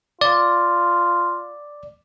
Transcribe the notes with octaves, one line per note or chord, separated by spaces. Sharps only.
F4 D5